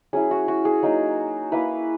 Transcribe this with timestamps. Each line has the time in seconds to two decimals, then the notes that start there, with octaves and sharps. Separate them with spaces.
0.13 F#3 C#4 E4 G#4
0.31 F#4
0.48 F#4
0.65 G#4
0.83 F#3 A#3 D#4
1.52 A#3 E4 B4